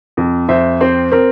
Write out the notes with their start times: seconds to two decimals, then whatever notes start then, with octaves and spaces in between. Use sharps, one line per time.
0.17 F2
0.48 F2 C5 E5
0.81 C4 C5
1.11 C4 A#4